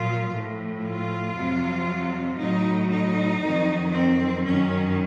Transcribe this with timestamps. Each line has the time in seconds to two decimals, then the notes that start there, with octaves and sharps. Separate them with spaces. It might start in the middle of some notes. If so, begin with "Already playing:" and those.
Already playing: A#2 F#3 F4
0.31 A2 F3
0.83 F4
1.34 F2 C3 F#3
2.38 A2 F#3 D#4
2.90 D#4
3.42 F2 D#3 F#3
3.93 C4
4.45 F#2 D#3 F#3 C#4